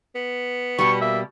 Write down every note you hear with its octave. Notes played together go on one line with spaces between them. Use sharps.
B3
B2 G3 C#6
A#3 E5